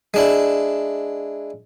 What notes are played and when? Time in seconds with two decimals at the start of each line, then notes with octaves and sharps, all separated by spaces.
0.14 G#3 D4 E4